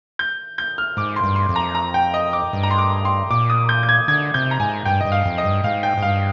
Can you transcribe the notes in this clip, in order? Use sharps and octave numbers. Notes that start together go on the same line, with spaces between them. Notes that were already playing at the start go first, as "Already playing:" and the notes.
G6
G6
F6
G#2 D6
C6
G2
C6
F2
A#5
A#5
G5
D#5
D6
G2
A#5
C6
D6
C6
A#2 D6
D#6
G6
G6
G#6
D3 G#6
C3 G6
A#5
G#2 G#5
G2 G5
G2 D#5
F5
F2
D#5
G2
G#2 F5
G5
G#2
G2 F5